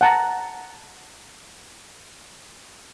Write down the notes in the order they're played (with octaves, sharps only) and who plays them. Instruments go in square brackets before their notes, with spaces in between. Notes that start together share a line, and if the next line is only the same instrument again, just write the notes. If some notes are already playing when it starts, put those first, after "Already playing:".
[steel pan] F#5 A5 A#5